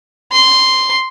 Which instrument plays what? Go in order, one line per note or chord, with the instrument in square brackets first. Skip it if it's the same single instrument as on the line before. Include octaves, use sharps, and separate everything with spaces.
[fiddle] C6